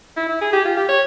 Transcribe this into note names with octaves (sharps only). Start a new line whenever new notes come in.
E4
E4
G#4
G4
F4
G4
C#5